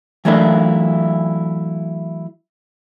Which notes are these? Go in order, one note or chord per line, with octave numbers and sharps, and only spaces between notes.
E3 F#3 A3 A#3 D4 E4